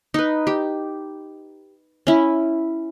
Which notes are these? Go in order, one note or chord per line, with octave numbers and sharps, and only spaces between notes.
D#4 B4
G4
C#4 E4